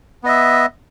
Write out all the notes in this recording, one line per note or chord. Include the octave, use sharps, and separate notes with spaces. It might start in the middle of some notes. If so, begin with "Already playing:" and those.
B3 D#5 E5